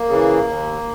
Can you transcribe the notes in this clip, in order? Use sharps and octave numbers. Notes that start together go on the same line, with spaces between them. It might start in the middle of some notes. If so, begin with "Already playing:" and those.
Already playing: A#3
C#3 E3
D#2